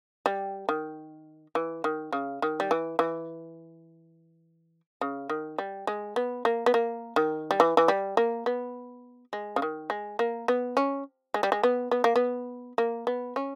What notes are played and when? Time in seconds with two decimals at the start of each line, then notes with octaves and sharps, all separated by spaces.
0.26 G3
0.69 D#3
1.55 E3
1.84 D#3
2.13 C#3
2.42 D#3
2.60 G3
2.71 E3
2.99 E3
5.01 C#3
5.29 D#3
5.58 G3
5.87 G#3
6.16 B3
6.45 A#3
6.66 B3
6.74 A#3
7.16 D#3
7.51 G3
7.60 E3
7.77 E3
7.88 G3
8.17 A#3
8.46 B3
9.33 G#3
9.56 C#3
9.62 D#3
9.90 G#3
10.19 A#3
10.48 B3
10.77 C#4
11.34 G#3
11.43 G3
11.52 G#3
11.63 B3
11.91 B3
12.04 A#3
12.16 B3
12.78 A#3
13.07 B3
13.36 C#4